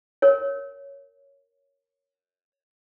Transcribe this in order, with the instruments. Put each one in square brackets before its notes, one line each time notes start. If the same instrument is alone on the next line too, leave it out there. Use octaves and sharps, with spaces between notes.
[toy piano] A#4 C#5